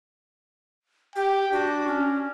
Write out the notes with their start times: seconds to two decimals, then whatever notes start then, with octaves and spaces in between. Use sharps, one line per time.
1.16 G4 G5
1.52 D4 F#4
1.87 C#4